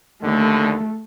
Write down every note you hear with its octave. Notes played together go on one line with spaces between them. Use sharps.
D#2 D3 A3